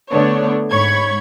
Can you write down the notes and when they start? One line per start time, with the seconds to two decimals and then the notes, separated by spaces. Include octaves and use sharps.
0.10 D3 A3 B3 D4 C#5
0.71 G#2 C#5 B5 C#6 G#6